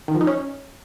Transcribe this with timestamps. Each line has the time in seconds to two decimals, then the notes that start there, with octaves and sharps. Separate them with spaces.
0.08 D#3
0.14 F3
0.21 D#4
0.27 C#4